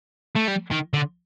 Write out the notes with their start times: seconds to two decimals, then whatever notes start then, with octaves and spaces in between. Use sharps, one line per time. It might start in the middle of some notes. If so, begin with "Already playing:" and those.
0.35 A3
0.47 G3
0.71 D#3
0.93 D3